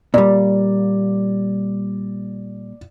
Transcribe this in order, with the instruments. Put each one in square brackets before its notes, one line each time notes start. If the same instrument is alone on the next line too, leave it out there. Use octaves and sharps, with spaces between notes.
[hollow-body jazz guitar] A#2 G3 [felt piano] D5